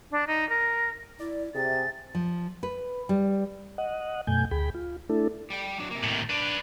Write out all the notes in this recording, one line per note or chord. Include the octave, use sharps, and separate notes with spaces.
D4
D#4
A#4
E4 D5
C3 G#4 E5 A6
F3
B4
G3
D#5 F#5
F#2 B2 A3 G#5 G6
D2 G#4 G5 B5
F4
A3 D4 E4 A4
G3 G5
F#3 D4
C3 A#3
A2 D#3
D4 B4 D5